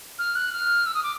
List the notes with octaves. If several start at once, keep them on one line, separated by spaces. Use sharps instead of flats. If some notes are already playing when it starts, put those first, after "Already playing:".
F6
F#6
F6
E6
D#6
D6